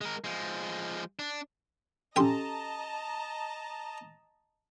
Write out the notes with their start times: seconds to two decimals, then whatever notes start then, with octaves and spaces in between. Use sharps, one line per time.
0.01 G#3 A#4
0.24 F3 G#3
1.19 D4
2.16 C#4 G4 A4 D#5 G5 A5 A#5 C6